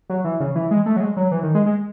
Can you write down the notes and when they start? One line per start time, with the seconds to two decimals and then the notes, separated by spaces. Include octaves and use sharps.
0.10 F#3
0.25 E3
0.40 C#3
0.55 E3
0.71 G#3
0.86 A3
0.96 F#3
1.00 G#3
1.17 F#3
1.32 E3
1.43 D#3
1.55 G#3
1.66 G#3